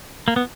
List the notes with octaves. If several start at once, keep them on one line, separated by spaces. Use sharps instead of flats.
A#3
B3